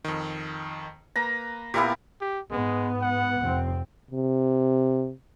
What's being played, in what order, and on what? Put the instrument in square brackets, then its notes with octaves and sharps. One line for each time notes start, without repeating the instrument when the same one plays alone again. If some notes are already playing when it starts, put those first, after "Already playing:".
[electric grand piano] F2 D#3
[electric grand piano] A#3 B4 [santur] A#5
[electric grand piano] A#2 A#4 F5 [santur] B3 E4 G4
[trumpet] G4
[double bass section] G#2 B3 [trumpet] G#3
[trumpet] F#5
[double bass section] F1 C4
[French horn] C3